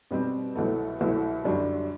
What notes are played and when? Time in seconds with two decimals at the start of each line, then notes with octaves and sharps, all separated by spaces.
0.11 B2 G3 C4
0.55 C2 B2 F#3 A3
1.00 C2 B2 F#3 A3
1.45 F#2 D3 G3 D4 F#4